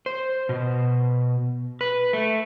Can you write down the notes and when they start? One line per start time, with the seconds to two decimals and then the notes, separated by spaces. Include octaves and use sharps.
0.06 C5
0.49 B2
1.81 B4
2.13 A3